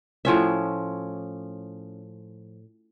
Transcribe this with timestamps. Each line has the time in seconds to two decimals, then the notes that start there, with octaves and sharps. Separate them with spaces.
0.25 A2 F3 C#4 E5